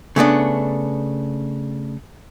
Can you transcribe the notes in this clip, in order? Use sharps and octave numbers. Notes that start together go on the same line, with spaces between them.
C#3 A3 B3 D4